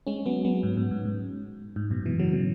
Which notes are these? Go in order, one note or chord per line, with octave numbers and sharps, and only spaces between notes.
G#3 C#4
F#3 B3
F#3 B3
G#2
G#2
G#2
G#2
G#2
F#2 B2
B2 E3
C#3 F#3
B2 E3